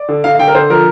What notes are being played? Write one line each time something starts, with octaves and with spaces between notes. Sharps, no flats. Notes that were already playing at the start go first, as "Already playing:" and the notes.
Already playing: D5
D3
D3 F5
F5
D3 G5
A#4
D3 C5
F3 A#4